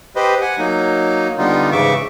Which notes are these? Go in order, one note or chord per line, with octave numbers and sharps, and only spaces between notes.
G4 B4 C5 D#5
F#5 G#5
F#3 A#3 D#4
D3 G3 B3 D#4 F4
G#2 C#3 E3 E5 C#6 D6